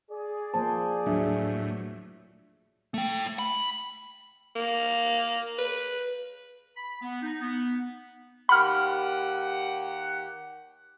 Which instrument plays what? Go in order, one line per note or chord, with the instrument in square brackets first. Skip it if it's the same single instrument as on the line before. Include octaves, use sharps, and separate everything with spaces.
[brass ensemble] G#4 D5
[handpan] F3 A#3 C5 [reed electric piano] A5
[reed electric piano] D#2 D4 E5 [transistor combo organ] A2 [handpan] F#3
[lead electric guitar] A3 G5
B5
[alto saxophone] A#3
B4
[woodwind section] B5
B3
D#4
B3
[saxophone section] D#2 G4 F#5 [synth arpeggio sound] B5 F6